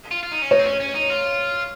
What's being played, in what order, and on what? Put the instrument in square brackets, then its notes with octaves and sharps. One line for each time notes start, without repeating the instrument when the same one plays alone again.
[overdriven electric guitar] F4
F4
D#4
C#4
[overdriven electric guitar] D#4 [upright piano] C#5
[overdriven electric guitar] C4
C#4
C#4
D#4
F4